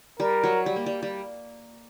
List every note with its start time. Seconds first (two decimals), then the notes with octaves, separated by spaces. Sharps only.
0.20 G3 A#4
0.44 F#3
0.66 G3
0.76 A#3
0.86 G3
1.03 G3